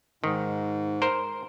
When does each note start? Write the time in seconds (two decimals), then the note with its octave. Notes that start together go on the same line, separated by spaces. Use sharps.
0.24 G#2 D#3
1.02 A#4 C5